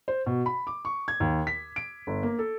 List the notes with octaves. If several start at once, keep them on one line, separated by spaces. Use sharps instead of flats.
C5
B2
B5
D6
C#6
G#6
D#2
B6
D7
G1
A#3
A4